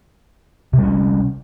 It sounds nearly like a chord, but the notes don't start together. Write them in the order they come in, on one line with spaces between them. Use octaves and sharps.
C3 G3 C#4